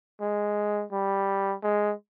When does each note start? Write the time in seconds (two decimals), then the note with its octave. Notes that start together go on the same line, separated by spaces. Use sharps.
0.21 G#3
0.92 G3
1.63 G#3